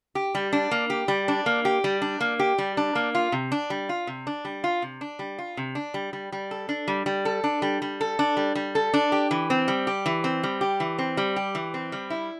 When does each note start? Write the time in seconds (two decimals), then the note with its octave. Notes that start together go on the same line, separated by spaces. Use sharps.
0.15 G4
0.35 G3
0.53 D4
0.71 A#3
0.90 G4
1.08 G3
1.28 D4
1.46 A#3
1.65 G4
1.84 G3
2.02 D4
2.20 A#3
2.39 G4
2.58 G3
2.77 D4
2.95 A#3
3.15 F4
3.32 C3
3.52 D4
3.70 G3
3.89 F4
4.07 C3
4.27 D4
4.45 G3
4.64 F4
4.82 C3
5.01 D4
5.19 G3
5.39 F4
5.57 C3
5.75 D4
5.94 G3
6.13 G3
6.32 G3
6.51 A4
6.69 D4
6.88 G3
7.06 G3
7.25 A4
7.44 D4
7.62 G3
7.82 G3
8.01 A4
8.19 D4
8.37 G3
8.55 G3
8.75 A4
8.94 D4
9.12 G4
9.31 E3
9.50 C4
9.68 G3
9.87 G4
10.06 E3
10.24 C4
10.43 G3
10.61 G4
10.80 E3
10.99 C4
11.17 G3
11.36 G4
11.55 E3
11.74 C4
11.92 G3
12.10 E4